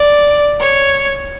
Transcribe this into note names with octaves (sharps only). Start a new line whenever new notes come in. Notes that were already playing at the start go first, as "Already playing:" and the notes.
Already playing: D5
C#5